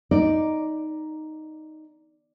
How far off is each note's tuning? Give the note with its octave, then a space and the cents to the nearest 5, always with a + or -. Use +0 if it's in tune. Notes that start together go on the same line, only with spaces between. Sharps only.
D#4 +0 D5 +0